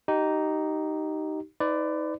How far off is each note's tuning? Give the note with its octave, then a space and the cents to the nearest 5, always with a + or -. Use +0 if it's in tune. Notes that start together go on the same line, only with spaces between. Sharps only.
D#4 +0 G4 -25
D#4 +30 B4 +35 D5 +0